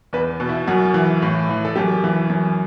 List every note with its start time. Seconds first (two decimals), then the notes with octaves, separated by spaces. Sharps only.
0.13 E2 B4
0.40 B2
0.49 E4
0.67 F#2 F#4
0.94 E3
1.22 A2
1.49 E3
1.65 A4
1.76 F#2 G4
2.04 E3
2.30 F#2